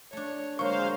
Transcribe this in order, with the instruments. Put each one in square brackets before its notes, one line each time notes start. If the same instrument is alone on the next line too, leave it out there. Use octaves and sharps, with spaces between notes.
[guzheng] A3 D4 [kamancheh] C#5
[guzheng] D3 F#3 [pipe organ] G#3 C5 F5 [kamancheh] A#3 [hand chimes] C#6